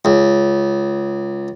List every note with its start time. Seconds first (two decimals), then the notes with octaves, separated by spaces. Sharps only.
0.05 C#2